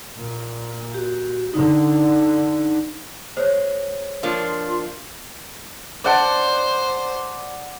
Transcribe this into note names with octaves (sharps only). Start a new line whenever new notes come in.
A#2
F#4 G4
D3 D#4
G#3 C5 C#5
F3 A#3 D4 F4
C5 D5 F#5 A5